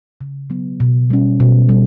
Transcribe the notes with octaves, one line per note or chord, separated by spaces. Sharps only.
C#3
F#3 B3
B2
G3 C#4
B2
G3